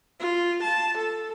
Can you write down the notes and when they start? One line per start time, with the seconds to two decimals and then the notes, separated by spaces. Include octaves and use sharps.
0.20 F4
0.63 A5
0.98 A4